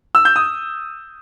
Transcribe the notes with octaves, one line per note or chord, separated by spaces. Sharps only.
E6
G6
D#6